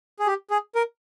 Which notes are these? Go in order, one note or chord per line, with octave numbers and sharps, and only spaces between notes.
G#4
G4
G#4
A#4